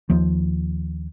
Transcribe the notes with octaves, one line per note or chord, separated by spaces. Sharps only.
D#2 F3